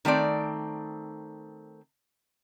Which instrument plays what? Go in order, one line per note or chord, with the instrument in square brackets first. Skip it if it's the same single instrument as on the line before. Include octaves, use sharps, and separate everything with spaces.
[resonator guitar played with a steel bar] D#3 A3 C4 D5